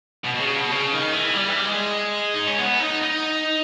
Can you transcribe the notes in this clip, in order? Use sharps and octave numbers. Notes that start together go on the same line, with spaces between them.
B2
B2
C#3
B2
C#3
D#3
E3
G3
E3
G3
G#3
D#4
C#4
B3
D#4
D#4